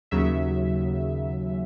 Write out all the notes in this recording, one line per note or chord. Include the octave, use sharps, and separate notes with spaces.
D#2 C#3 F#3 E5